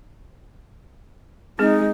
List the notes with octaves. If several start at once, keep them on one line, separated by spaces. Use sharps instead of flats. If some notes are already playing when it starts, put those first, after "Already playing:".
G#3 C4 D#4 G#4